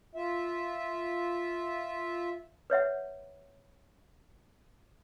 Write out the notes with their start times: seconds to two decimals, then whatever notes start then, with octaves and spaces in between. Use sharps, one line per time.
0.15 F4 E5
2.70 B4 C#5 E5 F#5